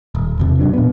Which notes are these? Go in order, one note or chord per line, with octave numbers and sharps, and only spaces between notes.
D#1
E2 C3
G#2 F#3 D4
A#2 B3